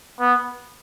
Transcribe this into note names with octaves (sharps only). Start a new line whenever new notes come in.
B3